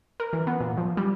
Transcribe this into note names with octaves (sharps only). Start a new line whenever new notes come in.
A#4
E3
B3
A#2
F3
G3